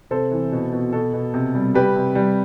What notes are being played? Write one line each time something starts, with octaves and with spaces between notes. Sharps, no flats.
C3 A4 C5
E3
B2
B2
B2 A4
B2
C3
G3
G3 G4 B4
C3
G3